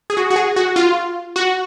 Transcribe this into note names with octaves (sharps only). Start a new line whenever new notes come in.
G#4
F#4
F#4
G#4
F#4
F4
F#4